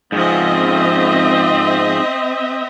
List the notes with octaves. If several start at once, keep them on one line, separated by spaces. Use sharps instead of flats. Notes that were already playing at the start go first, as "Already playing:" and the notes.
G#2 F3 C4 D#5 E5